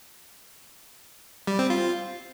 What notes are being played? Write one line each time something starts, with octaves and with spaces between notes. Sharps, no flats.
G3
C4
F4